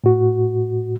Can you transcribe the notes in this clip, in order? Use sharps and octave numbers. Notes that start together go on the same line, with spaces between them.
A2 F#4